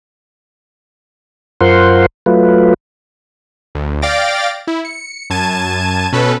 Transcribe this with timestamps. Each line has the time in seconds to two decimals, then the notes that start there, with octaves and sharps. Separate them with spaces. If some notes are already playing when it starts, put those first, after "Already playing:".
1.61 F#2 F4 A#4 C5 F#5 C6
2.26 F#3 A3 F4 B4
3.75 D2
4.02 D5 F5 G5 A6 A#6 D7
4.68 E4
4.85 C#7
5.30 F#2 A5 G#6 D#7 E7
6.12 B2 C#4 A4 B4